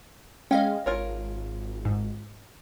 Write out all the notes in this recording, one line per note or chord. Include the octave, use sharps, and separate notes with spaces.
G#3 C#4 D#5 F5 G5
G#1 F4 A#4 C#5
G#2